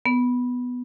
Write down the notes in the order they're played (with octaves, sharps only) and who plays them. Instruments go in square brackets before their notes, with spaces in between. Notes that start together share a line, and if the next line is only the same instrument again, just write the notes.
[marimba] B3